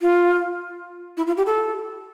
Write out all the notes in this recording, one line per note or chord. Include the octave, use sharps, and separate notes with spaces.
F4
E4
F4
G4
A4